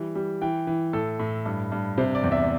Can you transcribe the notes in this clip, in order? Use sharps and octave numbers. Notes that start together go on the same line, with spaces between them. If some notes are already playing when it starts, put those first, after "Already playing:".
Already playing: E3 G3
G3
E3 G5
E3
A2 A4
A2
G2
G2
C3 C5
D5
E2
E5